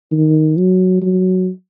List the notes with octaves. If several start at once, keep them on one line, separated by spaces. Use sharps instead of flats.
D#3
F#3
F#3